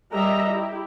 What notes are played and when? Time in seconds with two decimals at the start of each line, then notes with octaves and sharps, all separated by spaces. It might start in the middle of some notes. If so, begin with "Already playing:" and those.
0.13 G3 G4 A#4 D#5 E5 A#5
0.49 E4 G4